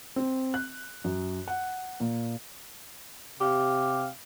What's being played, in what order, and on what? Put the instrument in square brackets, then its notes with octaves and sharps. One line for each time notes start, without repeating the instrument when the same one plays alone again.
[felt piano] C4
F#6
F#2
F#5
A#2
[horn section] C3 G4 F5